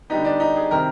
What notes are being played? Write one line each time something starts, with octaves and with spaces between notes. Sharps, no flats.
D3 G3 B3 D#4
D4
D#4
G#4
C3 D#3 G3 C4 A#4